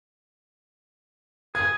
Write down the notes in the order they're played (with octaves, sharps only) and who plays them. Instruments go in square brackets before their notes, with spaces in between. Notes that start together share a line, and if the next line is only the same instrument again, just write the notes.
[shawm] G#4 [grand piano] G#6